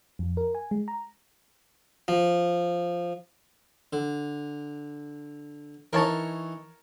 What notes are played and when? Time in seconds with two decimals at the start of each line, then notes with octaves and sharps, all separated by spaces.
0.19 F2
0.37 A#4
0.55 G#5
0.71 G#3
0.88 A#5
2.08 F3
3.93 D3
5.93 E3 D#4 A#4 C#5 A5